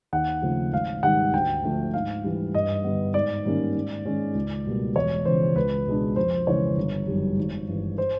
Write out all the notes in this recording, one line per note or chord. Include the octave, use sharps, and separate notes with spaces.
D#2 F#5
C#3 F3 A3 C4
G#1 F5
G#2 D#3 G3 F#5
D2 G5
D3 F3 A3 D4
G#2 F5
E3 G3
G2 D#5
D3 G3 B3
G#2 D5
D#3 G3 A#3 C#4
G#2
D#3 G#3 C#4
C#2
B2 G3 A#3
E1 C#5
E2 C#3 F3 C5
C#2 B4
B2 G#3 B3 D4
F2 C5
C#3 E3 G#3 C#5
G1
F#2 D#3 G3
G#1
G2 E3
C5